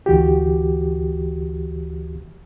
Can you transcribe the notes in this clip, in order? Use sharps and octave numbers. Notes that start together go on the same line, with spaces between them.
D2 E3 F#4 G4